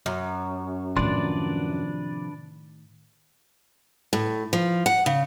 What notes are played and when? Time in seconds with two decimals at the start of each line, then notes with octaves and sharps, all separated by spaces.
0.06 F#2
0.97 A2 C3 D#3 F3 D4 B4 D5 C6
4.13 A2
4.53 F3
4.86 F#5
5.06 C#3